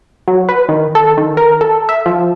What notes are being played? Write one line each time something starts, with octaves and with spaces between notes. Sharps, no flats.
F#3
B4
D#3
A4
D#3
A#4
A4
E5
F3